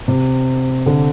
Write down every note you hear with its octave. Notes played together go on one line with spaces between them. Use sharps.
C3
D3